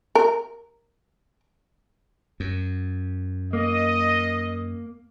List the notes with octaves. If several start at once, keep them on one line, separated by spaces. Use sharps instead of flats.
A#4
F#2
A#3 D#5